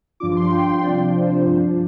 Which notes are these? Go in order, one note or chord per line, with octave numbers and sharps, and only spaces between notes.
G2 F3 D4 F4 D6
C6
G5
C3 F3 D4 F4 D5
C5
G2 F3 D4